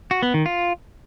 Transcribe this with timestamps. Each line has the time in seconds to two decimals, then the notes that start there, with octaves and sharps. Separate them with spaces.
0.11 F#4
0.23 B3
0.34 D#3
0.46 F4